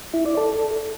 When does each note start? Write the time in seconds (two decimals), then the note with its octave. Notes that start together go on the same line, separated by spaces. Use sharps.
0.14 E4
0.25 D5
0.37 A4